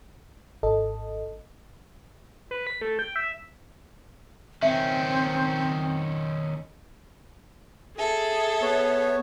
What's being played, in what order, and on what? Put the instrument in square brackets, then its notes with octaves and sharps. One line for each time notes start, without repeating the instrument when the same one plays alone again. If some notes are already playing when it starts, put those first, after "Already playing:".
[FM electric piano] G#1 A4 D#5
[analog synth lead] B4
B6
A3
G5
E5
[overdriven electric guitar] D#3 C#4 [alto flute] C4 [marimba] E5
[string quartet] G#4 A4 E5
[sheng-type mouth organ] B3 C#5